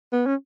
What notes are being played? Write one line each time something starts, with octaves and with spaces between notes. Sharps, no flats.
B3
C#4